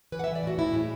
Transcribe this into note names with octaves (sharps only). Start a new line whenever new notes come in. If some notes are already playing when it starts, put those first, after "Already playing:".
E3 B4
F#5
E3 E5
D5
A2 F#4
A2 E4
A2 G#3